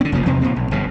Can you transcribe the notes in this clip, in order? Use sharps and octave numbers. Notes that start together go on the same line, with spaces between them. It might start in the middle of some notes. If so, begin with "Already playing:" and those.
D3 C4
F1 C#3 F3 A#3
E2 C3 C4
A#2 F3 C4
B1
G1 G2 B2